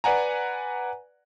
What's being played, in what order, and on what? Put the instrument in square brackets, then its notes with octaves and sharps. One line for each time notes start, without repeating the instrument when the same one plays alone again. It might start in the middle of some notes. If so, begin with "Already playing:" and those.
[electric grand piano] B4 D5 F#5 G#5 A#5